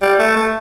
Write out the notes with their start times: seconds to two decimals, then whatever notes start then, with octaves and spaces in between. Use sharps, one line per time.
0.02 G3
0.19 A3
0.36 A3